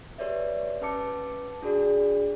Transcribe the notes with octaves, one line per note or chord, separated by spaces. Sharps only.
G4 B4 C#5 D5 E5
C#4 B4 A5 D6 C#7
D4 F#4 G#4 D5